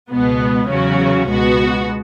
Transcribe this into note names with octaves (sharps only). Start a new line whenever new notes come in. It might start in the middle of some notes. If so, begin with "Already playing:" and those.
C#2 B2 G#3 B3
E2 C#3 F#3 C#4 F#4
C#2 B2 G#3 B3 F#4